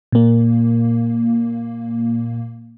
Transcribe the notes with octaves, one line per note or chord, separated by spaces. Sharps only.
A#2 A#3